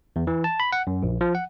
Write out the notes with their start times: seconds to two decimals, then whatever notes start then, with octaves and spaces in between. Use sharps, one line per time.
0.16 E2
0.27 E3
0.44 A5
0.60 B5
0.73 F#5
0.87 F#2
1.03 A#1
1.21 F3
1.35 F#5